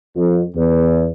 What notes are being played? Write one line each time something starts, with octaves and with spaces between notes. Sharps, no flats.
F2
E2